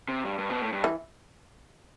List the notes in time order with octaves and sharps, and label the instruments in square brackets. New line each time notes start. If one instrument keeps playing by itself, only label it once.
[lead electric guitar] C3
G2
G2
B2
A2
G2
[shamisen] E3